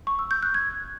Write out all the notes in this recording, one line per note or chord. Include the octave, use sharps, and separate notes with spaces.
C#6
E6
G6
F#6
G#6